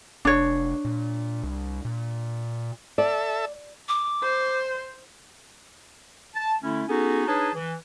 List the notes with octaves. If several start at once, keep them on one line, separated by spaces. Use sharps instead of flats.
F1 D4 C#5
A#2
C2
A#2
A4 D5 E5
D6
C5
A5
D3 A3 C#4 E4
B3 C#4 D#4 F#4 G#4 A4
D4 D#4 G#4 B4 C#5 A5
E3